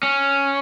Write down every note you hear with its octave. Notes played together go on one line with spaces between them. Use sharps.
C#4